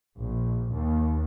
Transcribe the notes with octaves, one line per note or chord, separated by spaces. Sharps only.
A#1
D#2